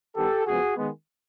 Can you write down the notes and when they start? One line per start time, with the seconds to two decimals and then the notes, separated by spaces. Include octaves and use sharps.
0.16 D#3 G3 B3 G4 A4
0.46 C#3 F3 G#3 B3 F#4 G#4
0.77 D#3 G#3 B3